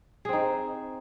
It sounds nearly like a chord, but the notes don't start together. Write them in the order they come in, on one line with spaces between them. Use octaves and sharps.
G#4 C4 D#4